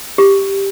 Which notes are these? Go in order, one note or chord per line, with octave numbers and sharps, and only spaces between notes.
G4